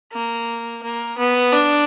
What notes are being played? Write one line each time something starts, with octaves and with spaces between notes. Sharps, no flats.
A#3
A#3
B3
D4